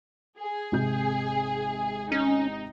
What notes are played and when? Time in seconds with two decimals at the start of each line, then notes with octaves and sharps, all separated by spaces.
0.39 G#4
0.72 G#1 C3 G6
2.12 C#4 D#4